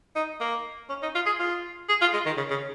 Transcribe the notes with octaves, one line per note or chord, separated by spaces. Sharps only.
D#4
A#3
C#4
D#4
F4
G#4
F4
G#4
F4
G#3
D#3
C#3
C#3